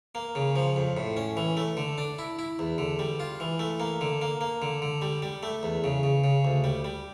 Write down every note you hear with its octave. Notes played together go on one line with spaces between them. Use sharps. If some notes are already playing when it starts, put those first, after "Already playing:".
A#3
C#3
F3
F2
A2
C#4
E3
A3
D3
D4
E4
E4
E2
D3
G3
F4
E3
A3
A#3
D3
A#3
A#3
D3
D3
G3
G3
A3
E2
C#3
C#3
C#3
D2
G3
G3